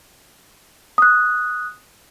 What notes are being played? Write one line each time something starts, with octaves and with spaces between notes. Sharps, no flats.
D#6 F#6